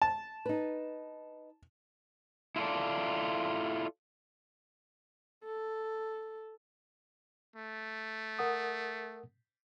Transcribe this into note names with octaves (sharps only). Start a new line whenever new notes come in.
A5
D#4 B4
E4 F4 A4 D5
A4
A3
A#4 F#5 D#6